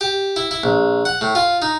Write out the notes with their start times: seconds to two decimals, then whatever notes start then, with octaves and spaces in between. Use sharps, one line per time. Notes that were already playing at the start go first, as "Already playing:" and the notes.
0.01 G4
0.36 E4
0.51 E4
0.63 A#1
1.05 F#5
1.21 A2
1.35 F4
1.62 D#4